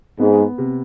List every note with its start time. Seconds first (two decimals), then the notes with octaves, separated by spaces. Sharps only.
0.19 G#2 B3
0.58 C3